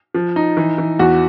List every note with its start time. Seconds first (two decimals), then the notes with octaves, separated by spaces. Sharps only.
0.14 F3
0.36 D#4
0.57 E3
0.78 E3
0.99 E2 F#4